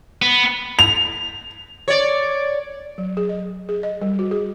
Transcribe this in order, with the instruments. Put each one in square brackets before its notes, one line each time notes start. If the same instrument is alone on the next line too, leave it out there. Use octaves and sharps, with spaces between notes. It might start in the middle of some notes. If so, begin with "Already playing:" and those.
[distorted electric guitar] B3
[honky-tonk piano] F7
[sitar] C#5 D5
[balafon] F#3
G#4
D#5
G#4
D#5
G3
F#4
G#4